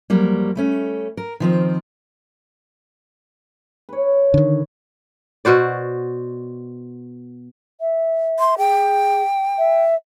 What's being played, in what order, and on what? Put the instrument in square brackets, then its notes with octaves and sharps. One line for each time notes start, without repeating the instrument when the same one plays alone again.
[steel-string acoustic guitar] F2 F#3 G3 A#3
G3 A3 C#4
A#4
D#3 F3 C4
[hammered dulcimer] B4 C#5
[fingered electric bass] D3 D#3
[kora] B2 F#4 C5 D5
[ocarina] E5
[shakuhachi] C6
[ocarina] G#4 [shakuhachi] G5
[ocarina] E5